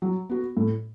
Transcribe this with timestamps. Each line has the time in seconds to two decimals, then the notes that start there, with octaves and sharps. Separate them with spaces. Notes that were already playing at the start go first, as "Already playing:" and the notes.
0.02 F#3
0.30 B3 F#4
0.57 A2